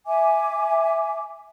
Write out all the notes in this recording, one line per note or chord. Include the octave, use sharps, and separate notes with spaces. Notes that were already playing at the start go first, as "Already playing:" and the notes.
E5 G#5 D6